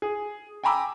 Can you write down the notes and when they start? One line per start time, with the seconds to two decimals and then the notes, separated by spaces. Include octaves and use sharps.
0.02 G#4
0.64 G5 G#5 A#5 B5 D6 E6